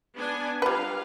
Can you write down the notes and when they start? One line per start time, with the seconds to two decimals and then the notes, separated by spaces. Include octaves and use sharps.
0.17 B3 D4 G#5
0.62 G3 F4 B4 F5